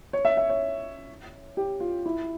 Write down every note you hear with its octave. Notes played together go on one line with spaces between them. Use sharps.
C#5
E5
E5
C#5
G4
F4
E4